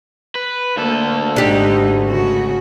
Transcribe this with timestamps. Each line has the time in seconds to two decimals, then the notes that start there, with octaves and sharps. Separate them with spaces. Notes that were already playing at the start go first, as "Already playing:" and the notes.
0.35 B4
0.77 D2 A#3 A4
1.36 G#1 G#2 A3 D4 D#4 G4
2.09 C#3 F#4